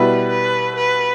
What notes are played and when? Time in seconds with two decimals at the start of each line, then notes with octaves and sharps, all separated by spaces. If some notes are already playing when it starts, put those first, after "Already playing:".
Already playing: B2 G3 B3 E4 B4
0.30 B4
0.77 B4